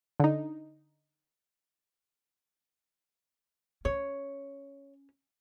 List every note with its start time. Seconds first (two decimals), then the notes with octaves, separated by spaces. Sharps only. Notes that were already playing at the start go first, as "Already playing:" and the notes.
0.20 D3 D#4
3.85 C#4 C#5